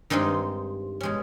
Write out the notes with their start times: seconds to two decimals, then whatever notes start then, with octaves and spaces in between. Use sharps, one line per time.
0.10 G2 D#3 G#3 C4
1.01 B2 G#3 C#4